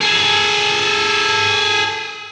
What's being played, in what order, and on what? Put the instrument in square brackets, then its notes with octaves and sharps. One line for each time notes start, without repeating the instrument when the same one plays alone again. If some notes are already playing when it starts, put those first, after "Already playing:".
[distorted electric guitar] G#4 A4